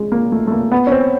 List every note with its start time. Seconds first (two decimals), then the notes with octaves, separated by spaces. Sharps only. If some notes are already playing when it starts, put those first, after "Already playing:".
Already playing: G#3
0.12 A#3
0.32 A3
0.47 A3
0.52 A#3
0.72 B3
0.87 C#4
0.92 C4